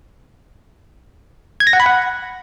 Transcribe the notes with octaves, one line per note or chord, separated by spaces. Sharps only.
G#6
A#6
F#5
B5
F#5